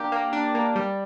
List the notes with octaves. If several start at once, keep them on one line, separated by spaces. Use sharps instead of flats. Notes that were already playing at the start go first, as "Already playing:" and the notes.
Already playing: A#3 D4 G4
A#3
D4
A#3
G3